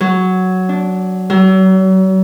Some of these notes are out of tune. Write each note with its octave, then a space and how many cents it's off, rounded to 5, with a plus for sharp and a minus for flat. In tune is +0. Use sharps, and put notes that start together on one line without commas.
F#3 +5
D4 -15
F#3 +40